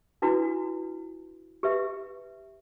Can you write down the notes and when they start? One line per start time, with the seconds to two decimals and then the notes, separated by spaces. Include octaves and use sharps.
0.22 D4 E4 F#4 B4
1.63 G4 B4 E5